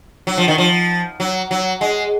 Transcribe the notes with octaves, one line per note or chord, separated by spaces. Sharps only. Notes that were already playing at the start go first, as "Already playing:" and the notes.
F#3
F3
D#3
F3
F#3
F#3
G#3